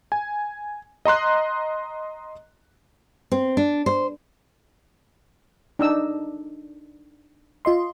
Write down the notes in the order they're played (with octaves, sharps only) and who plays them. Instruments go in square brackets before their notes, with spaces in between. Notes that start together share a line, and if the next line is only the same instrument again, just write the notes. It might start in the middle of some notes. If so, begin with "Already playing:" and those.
[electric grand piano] G#5
D#5 A#5 C6 F#6
[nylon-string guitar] C4
D4
C5
[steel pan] D4 D#4 E6
[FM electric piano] F4 D#5 C6